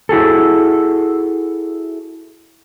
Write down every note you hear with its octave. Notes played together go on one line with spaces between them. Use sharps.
E4 F#4 G#4 A4